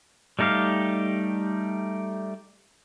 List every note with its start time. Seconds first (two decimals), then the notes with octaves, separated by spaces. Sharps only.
0.39 G3 A3 D#4 G4 F5